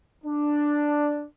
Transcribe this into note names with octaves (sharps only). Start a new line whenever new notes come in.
D4